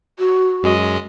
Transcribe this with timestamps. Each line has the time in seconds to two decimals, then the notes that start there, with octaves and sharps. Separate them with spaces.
0.19 F#4
0.63 F#2 G#3 D#5